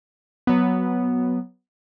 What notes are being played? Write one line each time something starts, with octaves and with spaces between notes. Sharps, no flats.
F#3 B3